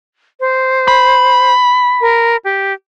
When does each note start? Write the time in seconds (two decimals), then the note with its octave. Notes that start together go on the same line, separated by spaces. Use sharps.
0.40 C5
0.88 B5
2.01 A#4
2.45 G4